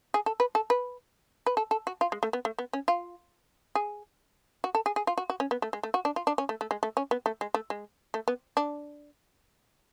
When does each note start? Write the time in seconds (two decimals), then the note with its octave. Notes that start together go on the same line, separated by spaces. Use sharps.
0.14 G#4
0.26 A4
0.40 B4
0.55 A4
0.70 B4
1.46 B4
1.57 A4
1.71 A4
1.87 F#4
2.01 F4
2.12 G#3
2.23 A3
2.33 B3
2.45 A3
2.58 B3
2.73 C#4
2.88 F4
3.75 G#4
4.64 F#4
4.75 A4
4.86 G#4
4.96 G#4
5.07 F4
5.18 F#4
5.30 F#4
5.40 C#4
5.51 B3
5.62 A3
5.73 G#3
5.83 A3
5.94 F#4
6.05 D4
6.16 F4
6.27 D4
6.38 C#4
6.49 A3
6.61 A3
6.71 G#3
6.83 A3
6.97 C#4
7.11 B3
7.26 A3
7.41 G#3
7.54 A3
7.70 G#3
8.14 A3
8.28 B3
8.57 D4